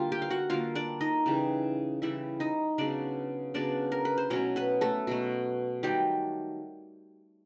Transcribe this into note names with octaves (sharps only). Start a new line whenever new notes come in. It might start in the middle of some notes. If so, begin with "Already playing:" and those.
Already playing: D3 G3 A#3 F4
G4 G5
F5
F#4 F#5
D3 G3 A#3 F4 F5
D4 D5
D#4 D#5
C#3 E3 G3
C#3 E3 G3 E4 E5
D#4 D#5
C#3 F#3 B3 D4 D5
C#3 F#3 B3 D4 D5
A#4
B4
C5
B2 F#3 A3 C#4 C#5
B3 B4
A3 A4
B2 F#3 A3
D#3 F#3 G3 A3 G4